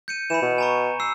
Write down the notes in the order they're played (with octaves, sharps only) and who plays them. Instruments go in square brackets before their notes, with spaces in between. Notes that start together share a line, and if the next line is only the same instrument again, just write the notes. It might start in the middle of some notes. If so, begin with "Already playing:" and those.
[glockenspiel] G6 C#7 D#7
[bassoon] E3 [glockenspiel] B5 C#7 E7
[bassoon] B2
[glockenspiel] G#5 A#5 C#6
E6 C7